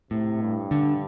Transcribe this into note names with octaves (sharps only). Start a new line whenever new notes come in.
A2 C3
G2
D3